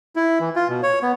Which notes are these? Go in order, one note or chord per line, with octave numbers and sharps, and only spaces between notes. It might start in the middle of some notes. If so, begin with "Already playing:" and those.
E4
E3
F4
B2
C#5
B3